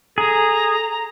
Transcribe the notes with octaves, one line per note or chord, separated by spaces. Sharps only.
G#4 A4 A#5